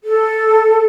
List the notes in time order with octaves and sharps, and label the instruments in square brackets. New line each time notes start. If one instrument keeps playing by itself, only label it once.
[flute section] A4